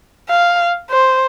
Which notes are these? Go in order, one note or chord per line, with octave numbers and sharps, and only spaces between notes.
F5
C5